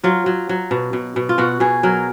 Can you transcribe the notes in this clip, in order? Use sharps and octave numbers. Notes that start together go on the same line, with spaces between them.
F#3 F4
F#3
F#3
B2
B2
B2
F4
B2 F#4
B2 G#4
F#3 A#4